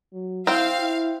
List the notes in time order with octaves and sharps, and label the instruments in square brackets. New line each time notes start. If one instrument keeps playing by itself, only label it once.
[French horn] F#3
[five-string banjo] C4 G5 [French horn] E4 [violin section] F5
[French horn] E4